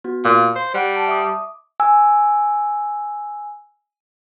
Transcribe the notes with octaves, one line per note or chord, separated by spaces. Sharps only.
B3 F#4
A#2 F5
C5
G3 F#5 F#6 D7
A5
E5 D6 D#6
G#5 E6